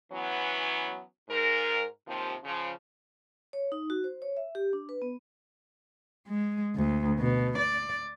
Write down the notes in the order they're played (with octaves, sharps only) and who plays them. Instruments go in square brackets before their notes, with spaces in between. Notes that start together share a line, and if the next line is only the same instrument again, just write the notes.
[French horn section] E3 F#3 B3 C#4
G#2 A#4
D#2 C3 F3
C#3 F3
[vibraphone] C#5
D#4
F#4
C5
C#5
E5
G4
D4
B4
B3
[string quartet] G#3
D2
B2
D5